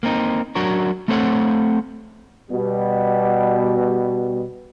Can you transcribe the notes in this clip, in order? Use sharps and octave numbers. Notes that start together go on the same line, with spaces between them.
A#3 C4 D#4
F#3 D4 F#4 A#4 C#5
A3 C4 A4 C5 C#5 F#5
B2 G3